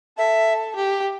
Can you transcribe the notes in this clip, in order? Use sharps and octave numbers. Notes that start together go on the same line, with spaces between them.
A4 E5
G4